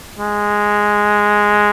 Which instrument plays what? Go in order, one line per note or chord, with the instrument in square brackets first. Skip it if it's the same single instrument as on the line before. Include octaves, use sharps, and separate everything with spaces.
[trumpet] G#3